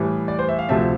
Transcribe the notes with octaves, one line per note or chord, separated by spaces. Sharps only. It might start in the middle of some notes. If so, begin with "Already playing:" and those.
Already playing: A2 E3 G3
D5
C5
E5
F5
D2 C3 F3 A3 C4 E5